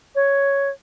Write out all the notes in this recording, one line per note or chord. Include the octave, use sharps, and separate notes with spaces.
C#5